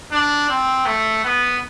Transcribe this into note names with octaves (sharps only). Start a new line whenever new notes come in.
D4
C4
A3
B3